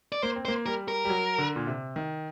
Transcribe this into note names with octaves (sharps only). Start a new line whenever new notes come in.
D5
A#3 C5
C4
C5
A#3
G3 A#4
A#4
G3
F#3
D3
A#2
C3
D#3